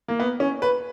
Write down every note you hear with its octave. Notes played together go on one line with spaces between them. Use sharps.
A#3
B3
C#4
B4